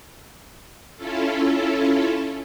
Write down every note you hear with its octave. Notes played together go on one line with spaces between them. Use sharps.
C#4 E4 F4 A4